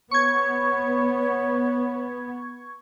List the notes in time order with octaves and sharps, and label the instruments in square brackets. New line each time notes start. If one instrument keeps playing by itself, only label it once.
[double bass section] B3 [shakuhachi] C#5 [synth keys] C#6 G#6